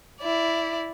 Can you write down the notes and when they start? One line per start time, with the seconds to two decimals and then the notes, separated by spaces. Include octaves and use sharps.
0.21 E4 D5